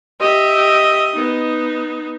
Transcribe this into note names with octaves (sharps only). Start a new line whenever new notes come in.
G4 D#5 E5
B3 D#4